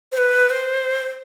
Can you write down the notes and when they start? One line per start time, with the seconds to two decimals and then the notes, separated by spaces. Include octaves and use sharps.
0.12 C5
0.17 B4
0.50 C5